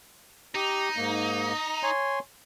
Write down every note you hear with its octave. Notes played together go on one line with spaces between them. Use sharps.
D#4 G4
G#2 A#3
C#5 G#5 C6